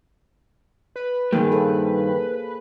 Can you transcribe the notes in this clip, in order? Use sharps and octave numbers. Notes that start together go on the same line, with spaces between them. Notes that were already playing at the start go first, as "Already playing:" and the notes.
B4
G2 D#3 G3 A#3 G#4
A4 C5